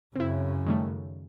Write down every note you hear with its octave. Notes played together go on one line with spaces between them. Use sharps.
F#2 C#3 C4 E4
D#3 G3 A3